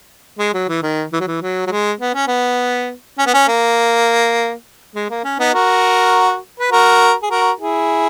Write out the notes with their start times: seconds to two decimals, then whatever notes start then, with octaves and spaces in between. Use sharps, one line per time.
0.39 G#3
0.54 F#3
0.69 E3
0.83 D#3
1.13 E3
1.20 F#3
1.27 E3
1.42 F#3
1.67 F#3
1.71 G#3
2.01 B3
2.15 C#4
2.28 B3
3.18 C#4
3.26 B3
3.34 C#4
3.48 A#3
4.95 G#3
5.10 A#3
5.24 C#4
5.39 B3 D#4
5.54 F#4 A#4
6.60 B4
6.72 F#4 A#4
7.23 G#4
7.31 F#4 A#4
7.60 E4 G#4